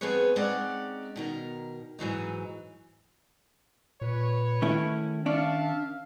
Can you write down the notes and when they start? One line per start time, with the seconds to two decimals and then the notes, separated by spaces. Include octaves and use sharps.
0.01 F3 B3 C4 G#4 B4 C#5
0.36 G#3 C4 C#4 D#4 D5 F#5
1.16 B2 D#3 A#4
1.99 G#2 E3 F#3 D#4
4.01 A#2 B4 C#5
4.62 D#3 A3 C#4 E4
5.26 C#4 D4 D5 E5 F5 A5